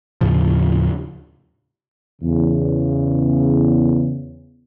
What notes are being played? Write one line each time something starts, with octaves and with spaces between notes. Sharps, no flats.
D#2 A2 C#3 F3
E2 C#3